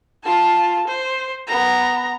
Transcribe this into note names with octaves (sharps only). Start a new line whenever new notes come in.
F4 A5
C5
B3 A#5